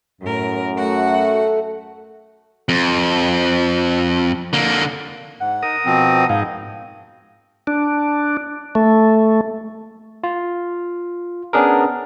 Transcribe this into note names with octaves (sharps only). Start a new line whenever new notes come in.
F#2 A2 A#4
A3 F#4 F#5
F2
D3 A#3
G#2 F#5
D#4 A#4 D#6
B2 F3 C4
G#2 D#4 F5
D4
A3
F4
B3 C#4 D4 G#4 A#4